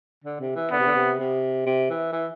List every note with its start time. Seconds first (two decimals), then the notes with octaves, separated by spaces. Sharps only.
0.24 D3
0.40 C3
0.56 E3
0.71 D3 B3
0.79 C3
0.87 D3
0.95 C3
1.19 C3
1.66 C3
1.90 E3
2.13 E3